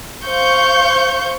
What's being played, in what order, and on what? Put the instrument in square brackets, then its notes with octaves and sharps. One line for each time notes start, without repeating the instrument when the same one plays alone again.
[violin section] C5 F5 C#6 G6